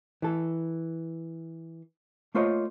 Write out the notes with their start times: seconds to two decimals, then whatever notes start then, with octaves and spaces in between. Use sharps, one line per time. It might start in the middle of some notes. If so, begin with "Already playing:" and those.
0.22 E3 A4
2.35 A3 A#3 F4 C5 C#5 D#5